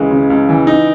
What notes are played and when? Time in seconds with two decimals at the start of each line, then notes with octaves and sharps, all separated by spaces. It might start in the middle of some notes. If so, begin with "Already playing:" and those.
Already playing: C#2 C#3 E3 G#3
0.11 C#3
0.30 C#2
0.49 E3
0.67 D#4